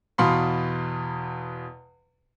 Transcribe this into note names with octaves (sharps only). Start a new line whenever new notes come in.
E2 B2 F5 B5 C6